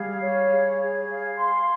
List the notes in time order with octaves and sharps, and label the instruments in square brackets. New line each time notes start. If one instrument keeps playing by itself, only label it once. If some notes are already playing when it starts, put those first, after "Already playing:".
Already playing: [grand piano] G3 [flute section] G#4 F5
[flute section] C#5
G#4
G#4
F5
C6